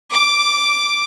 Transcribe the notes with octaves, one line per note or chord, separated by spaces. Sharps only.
D6